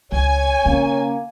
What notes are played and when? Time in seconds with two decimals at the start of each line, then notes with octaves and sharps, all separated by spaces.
0.12 C#2 C#5 G#5
0.65 C#3 A#3 C#4